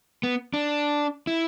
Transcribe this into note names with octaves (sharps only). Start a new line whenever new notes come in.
B3
D4
E4